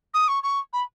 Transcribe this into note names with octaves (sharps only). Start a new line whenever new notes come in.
D#6
C#6
C#6
B5